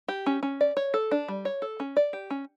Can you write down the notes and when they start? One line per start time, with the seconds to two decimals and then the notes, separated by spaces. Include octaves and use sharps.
0.08 G4
0.26 C#4
0.43 C#4
0.61 D5
0.77 C#5
0.94 A4
1.11 D4
1.28 G3
1.45 C#5
1.62 A4
1.80 C#4
1.97 D5
2.13 G4
2.30 C#4